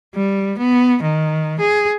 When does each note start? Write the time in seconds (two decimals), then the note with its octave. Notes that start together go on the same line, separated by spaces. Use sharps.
0.16 G3
0.59 B3
1.02 D#3
1.61 G#4